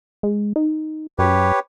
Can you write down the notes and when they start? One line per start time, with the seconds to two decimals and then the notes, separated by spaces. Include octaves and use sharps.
0.23 G#3
0.56 D#4
1.19 F#2 G4 B4 C#5